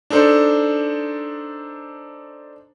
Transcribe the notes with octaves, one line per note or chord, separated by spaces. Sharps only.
D4 D#4 A4 C5